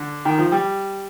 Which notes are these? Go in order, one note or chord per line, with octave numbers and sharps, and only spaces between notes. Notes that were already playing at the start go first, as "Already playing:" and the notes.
Already playing: D3
D#3
F3
G3